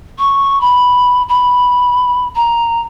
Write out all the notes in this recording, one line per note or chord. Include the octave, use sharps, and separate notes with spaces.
C#6
B5
B5
A#5